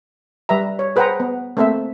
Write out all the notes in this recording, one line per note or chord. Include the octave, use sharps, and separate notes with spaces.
G3 B4 E5 A#5
C#5
G#4 B4 C5 F#5 G5 A#5
B3
A3 A#3 C4 A4 C5 E5